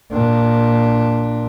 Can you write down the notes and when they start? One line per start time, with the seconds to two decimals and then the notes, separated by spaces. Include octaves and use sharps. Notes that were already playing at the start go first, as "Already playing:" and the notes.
0.12 A#2 D4